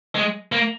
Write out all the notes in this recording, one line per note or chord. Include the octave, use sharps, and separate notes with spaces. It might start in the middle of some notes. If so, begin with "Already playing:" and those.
G#3
A#3